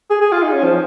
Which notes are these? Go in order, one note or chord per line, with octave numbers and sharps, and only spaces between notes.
G#4
G#4
F4
D#4
C#4
F3